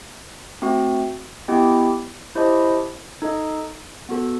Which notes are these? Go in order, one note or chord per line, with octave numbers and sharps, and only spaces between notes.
A3 C4 F#4
B3 E4 G4 D#5 G5
E4 G4 C5 D#5 A5
D#4 A4 D#5
B3 F#4 A4